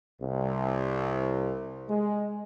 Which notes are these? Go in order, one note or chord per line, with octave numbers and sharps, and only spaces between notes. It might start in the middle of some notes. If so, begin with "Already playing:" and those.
C2
G#3